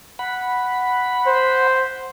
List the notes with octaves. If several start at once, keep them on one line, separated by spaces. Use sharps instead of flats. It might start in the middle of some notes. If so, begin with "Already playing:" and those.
F#5 B5
C5